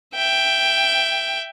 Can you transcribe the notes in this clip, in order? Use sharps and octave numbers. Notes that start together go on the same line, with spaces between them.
E5 G5